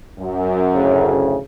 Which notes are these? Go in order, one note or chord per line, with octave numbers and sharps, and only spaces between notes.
F#2
D2 A2 C#3